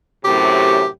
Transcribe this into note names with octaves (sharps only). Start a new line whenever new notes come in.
F#2 A2 C3 G4